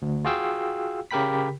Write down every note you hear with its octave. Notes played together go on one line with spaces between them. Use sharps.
D2
F4 F#4 G#4 F5 G5 E6
C#3 G4 A#4 G5 B5 B6